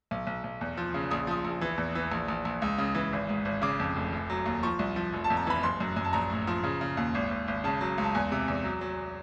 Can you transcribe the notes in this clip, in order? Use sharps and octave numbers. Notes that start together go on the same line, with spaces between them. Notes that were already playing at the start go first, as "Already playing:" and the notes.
B1
B1
B1
E2
F3
C#3
A#1 D#6
F3 D#6
A#1
E3
E2
E3
A#1
A#1
A#1
C#2
C#3
E3
G#1
G#2
G#1
C#3 D6
F2
F1
F1
F#3
D#2
F3 C#6
C2
F3
F1
A5
F2
A#5
E3 B5
F#1 C6
F#2
F#2
A5
A#1 A#5
A2
F3
C#3
C#3
D#2
G#1
G#1
G#1
C#3 A5
F#3
C#2
A5
E2 G#5
C3
E2
F#3
F#3